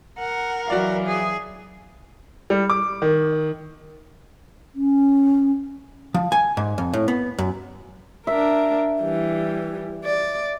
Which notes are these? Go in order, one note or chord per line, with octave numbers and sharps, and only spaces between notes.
A#4 F#5
E3 F#3 F#4 D5 F5
G#4
G3
D6
D#3
C#4
F3
G#5
G#2
F2
A2
B3
F#2
D4 A#4 E5
E3 G3
D5